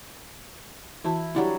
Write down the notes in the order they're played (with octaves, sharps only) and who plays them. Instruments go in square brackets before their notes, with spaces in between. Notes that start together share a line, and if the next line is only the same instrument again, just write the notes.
[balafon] E3 F#4 A5 [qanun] E4
[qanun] F#3 G3 D4 [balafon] E4 G4 F#5